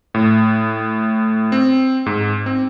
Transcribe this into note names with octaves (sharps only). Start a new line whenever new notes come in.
A2
C4
G#2
C4